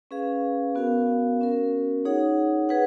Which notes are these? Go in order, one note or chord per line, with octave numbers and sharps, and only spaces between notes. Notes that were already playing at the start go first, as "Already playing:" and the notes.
C#4 G#4 B4 F5
B3 F#4 A#4 F5
C#4 F#4 A#4
D#4 G#4 C#5 F#5
G#4 B4 F#5